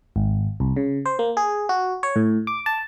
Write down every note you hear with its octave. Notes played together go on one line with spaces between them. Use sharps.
G#1
C2
C#3
C5
A#3
G#4
F#4
C#5
A2
D6
A5